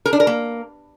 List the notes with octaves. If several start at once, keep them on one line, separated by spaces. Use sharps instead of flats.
A#4
D4
A#4
A#3